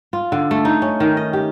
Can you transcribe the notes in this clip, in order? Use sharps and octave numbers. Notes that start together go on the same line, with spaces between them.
F4
D3
A3
D#4
C#4
D#3
D#5
G4